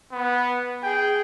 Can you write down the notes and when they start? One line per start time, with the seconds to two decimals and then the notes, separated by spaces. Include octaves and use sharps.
0.12 B3
0.83 G#4 G5